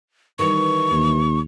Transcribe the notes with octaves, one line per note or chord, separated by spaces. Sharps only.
D#3 E3 G3 C#6
D#2